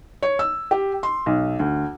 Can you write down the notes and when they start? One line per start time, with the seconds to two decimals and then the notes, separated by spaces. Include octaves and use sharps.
0.22 C#5
0.39 E6
0.71 G4
1.03 C6
1.26 B1
1.59 D2